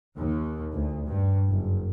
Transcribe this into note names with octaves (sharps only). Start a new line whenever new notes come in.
D#2
D2
G2
F#1